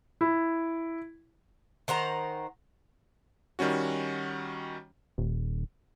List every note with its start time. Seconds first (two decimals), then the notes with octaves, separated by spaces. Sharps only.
0.21 E4
1.88 D#3 C5 F#5 A#5
3.59 D#3 G3 C#4 F#4
5.18 D#1